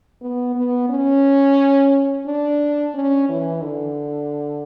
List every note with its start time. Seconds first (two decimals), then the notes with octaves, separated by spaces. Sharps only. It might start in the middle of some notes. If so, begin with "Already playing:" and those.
0.21 B3
0.55 B3
0.89 C#4
2.26 D4
2.94 C#4
3.29 E3
3.63 D3